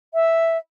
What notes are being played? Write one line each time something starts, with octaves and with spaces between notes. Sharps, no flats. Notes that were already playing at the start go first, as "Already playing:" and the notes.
E5